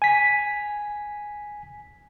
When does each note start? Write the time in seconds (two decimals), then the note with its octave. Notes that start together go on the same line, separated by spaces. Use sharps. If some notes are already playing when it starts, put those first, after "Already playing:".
0.02 G#5 B6